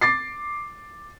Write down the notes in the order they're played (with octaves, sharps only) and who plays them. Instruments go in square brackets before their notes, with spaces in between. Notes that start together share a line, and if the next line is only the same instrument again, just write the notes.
[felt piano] D6 A6 C7